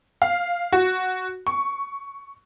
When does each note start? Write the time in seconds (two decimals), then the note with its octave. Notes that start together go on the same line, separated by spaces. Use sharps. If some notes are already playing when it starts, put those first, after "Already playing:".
0.22 F5
0.72 F#4
1.47 C#6